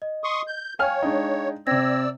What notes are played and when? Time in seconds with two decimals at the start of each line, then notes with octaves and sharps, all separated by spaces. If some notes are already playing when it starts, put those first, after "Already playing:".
0.02 D#5
0.24 C6 C#6 D#6
0.47 G6
0.79 C#5 F5 G5 G#5 F6
1.03 G#3 D4 D#4
1.67 C3 C4 D5 G5 E6 G#6 A#6